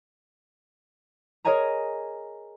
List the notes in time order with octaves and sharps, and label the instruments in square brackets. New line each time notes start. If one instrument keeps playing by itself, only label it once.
[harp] G#4 A#4 C#5 D#5 G#5 A#5